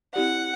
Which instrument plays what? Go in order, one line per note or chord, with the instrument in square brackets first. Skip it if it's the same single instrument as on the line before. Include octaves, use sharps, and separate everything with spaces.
[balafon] C4 E4 G4 D5 [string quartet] F#5